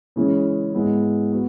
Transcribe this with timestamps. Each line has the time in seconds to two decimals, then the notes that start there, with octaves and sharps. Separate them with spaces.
0.16 C#3 E3 G#3 C#4
0.74 G#2 G#3 B3 E4
1.32 B3 F#4